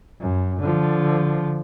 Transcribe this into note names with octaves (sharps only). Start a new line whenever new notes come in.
F#2
D3 F3